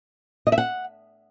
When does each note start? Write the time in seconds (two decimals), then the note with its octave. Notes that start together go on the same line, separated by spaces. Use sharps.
0.47 D#5
0.52 E5
0.58 F#5